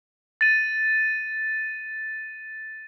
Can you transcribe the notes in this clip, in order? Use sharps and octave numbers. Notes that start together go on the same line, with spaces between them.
A6 D#7